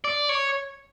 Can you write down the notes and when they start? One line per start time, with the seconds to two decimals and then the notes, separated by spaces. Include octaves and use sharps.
0.04 D5
0.29 C#5